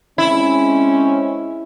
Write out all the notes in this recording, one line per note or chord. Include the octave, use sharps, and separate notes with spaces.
G#3 C4 C#4 E4